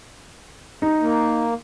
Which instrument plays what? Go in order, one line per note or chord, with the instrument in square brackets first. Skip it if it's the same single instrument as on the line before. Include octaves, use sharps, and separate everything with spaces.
[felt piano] D#4
[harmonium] A#3